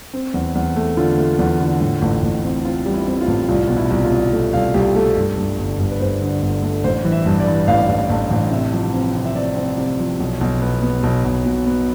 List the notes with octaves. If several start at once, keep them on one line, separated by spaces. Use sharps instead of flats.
C4
E2
E2
A3
D3 F4
A3
E2
D3
A2
A1
A1
C4
C4 F4
G3
E4
C4
F4
A1
C2 F4
B2 F4
E4
C2
F4
C2
A3
C2 F5
C2 G4
A3 A4
G2
G2
G1
G1
B4
G1 C5
D3
G1
A3
A1 C5
E3
E5
G2
D5
E3
A1 F5
A1
A1
A1
C3 E5
F3
C4
C3
E5
C4 D5
C4
C3
F3
B1
B1
B3
B3
B1
B1
B2
B3